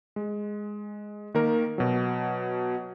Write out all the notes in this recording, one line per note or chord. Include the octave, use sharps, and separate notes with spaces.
G#3
D#3 A#3 A#4
B2 F#3